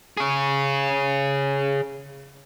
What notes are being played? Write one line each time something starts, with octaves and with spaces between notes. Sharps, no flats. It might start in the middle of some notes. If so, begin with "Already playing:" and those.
G#4 C#5